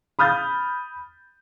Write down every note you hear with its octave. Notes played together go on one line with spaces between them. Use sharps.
B5 D#6 F6 G6 A6